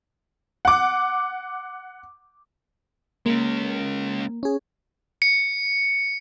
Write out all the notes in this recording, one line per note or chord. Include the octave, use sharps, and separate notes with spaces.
F#5 D6
G#3 A#3 C#4
C#4 G#4
C#7